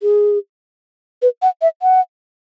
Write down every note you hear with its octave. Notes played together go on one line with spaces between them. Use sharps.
G#4
B4
F#5
E5
F#5